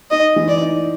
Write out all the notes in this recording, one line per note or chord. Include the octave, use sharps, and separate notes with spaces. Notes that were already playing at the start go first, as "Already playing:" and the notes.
D#4 D#5
E3
D5
D#4